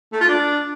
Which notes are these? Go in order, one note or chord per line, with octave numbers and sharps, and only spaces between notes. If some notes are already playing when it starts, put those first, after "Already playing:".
A3
F4
D4